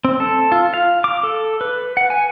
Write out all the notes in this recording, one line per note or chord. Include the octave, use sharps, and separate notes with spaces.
C4
A4
F4
F5
D6
A4
B4
F#5
G#5